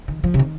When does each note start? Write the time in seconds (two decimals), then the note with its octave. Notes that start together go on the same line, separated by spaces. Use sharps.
0.08 D#3
0.24 F3
0.34 C3
0.39 D#3